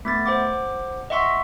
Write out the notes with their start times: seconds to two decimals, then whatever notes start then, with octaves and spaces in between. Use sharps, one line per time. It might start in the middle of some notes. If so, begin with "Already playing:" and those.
0.05 A3 B3 A6
0.26 C5 F#5 D6
1.10 D#5 E5 F#5 C6 C#6 E6